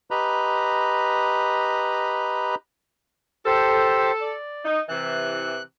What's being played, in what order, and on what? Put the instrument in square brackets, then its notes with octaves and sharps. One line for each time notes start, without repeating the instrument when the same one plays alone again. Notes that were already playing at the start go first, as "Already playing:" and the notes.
[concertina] G4 B4 D#5 A#5 B5
[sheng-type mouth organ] G4 C5 [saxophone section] A4
[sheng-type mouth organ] D5
[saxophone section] D#4
[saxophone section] C3 E3 [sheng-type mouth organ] F#6